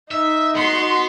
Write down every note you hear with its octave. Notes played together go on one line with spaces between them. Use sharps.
D#4 E5
B3 F#4 C6